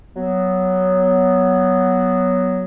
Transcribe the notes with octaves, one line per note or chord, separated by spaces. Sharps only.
F#3 B3